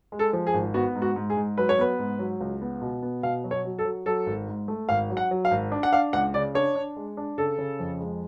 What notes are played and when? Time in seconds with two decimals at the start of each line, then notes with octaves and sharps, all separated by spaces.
0.12 G#3
0.19 A4
0.33 F3
0.47 G#4
0.54 G#1
0.74 B3 F#4
0.95 G#2
1.02 F#4
1.16 G#2
1.30 G#4
1.37 G#2
1.58 F#3 B4
1.69 C#5
1.78 B3 B4
1.99 G#2
2.19 F#3
2.41 C#2
2.61 B3
2.82 B2
3.02 B3
3.23 B2 F5
3.44 F#3
3.51 C#5
3.65 F#3
3.79 A4
3.85 F#3
4.06 F#3 A4
4.26 G#1
4.47 G#2
4.68 A3
4.89 G#1 F5
5.10 F#3
5.17 F#5
5.31 F#3
5.45 F5
5.51 G#1
5.72 D4
5.83 F#5
5.93 D4 F5
6.13 C#2 F#5
6.34 C#3 D5
6.55 D4 C#5
6.76 D4
6.96 G#3
7.17 D4
7.38 C#3 A4
7.58 C#3
7.79 F2
8.00 G#3